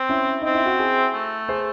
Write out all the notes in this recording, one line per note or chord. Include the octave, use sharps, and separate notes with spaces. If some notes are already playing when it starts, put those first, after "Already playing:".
Already playing: C4
C#4 E4
C4 D#4
E4
F#4
E4 G#4
A3
G#4 C5